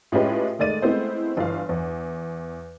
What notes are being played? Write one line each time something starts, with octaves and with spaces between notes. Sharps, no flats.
A2 G#3 C#4 F4 G4 B4
D#3 G#3 A3 D5 A6 D#7
G#3 A3 B3 C4 E4 C5
G1 E3 F5
E2